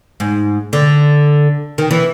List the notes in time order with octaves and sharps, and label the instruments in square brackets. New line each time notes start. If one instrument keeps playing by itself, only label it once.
[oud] G#2
D3
D#3
E3